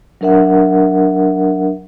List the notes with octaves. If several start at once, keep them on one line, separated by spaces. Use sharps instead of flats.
F#3 D4 A#4 E5 F#5